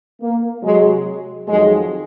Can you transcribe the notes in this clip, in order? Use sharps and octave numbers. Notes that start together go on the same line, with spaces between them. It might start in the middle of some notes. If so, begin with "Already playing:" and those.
A#3
C3 F#3 G#3
F2 D#3 F#3 G#3